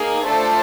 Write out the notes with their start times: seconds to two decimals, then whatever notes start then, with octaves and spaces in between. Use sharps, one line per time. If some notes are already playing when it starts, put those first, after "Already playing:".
Already playing: A#3 D#4 G#4
0.25 A3 D4 F4 A4 C5